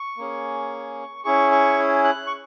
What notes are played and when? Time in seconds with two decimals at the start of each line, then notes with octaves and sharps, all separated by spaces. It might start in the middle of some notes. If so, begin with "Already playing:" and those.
Already playing: C#6
0.17 A#3 C#4 G#4
1.25 C#4 E4 G#4 C#6
1.51 C#6
2.04 F#6
2.27 C#6